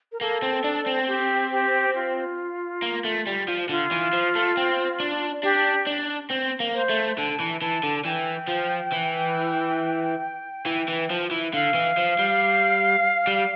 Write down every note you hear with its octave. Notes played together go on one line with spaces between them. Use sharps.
A#4
A#3 A4
C4
D4
C4
G4
G4
F4
A#3
A3
G3
F3
D3 F4
E3
F3
A3
C4
D4
D4 G4
D4
C4
A#3
C5
A3
D3 A5
E3
E3 A5
D3
E3 G5
F3
E3
E3
E3
F3
E3
D3 F5
E3
F3
G3
G3